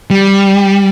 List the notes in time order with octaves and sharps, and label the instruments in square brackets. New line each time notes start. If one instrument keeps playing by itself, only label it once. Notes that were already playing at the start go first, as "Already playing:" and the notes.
[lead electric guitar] G3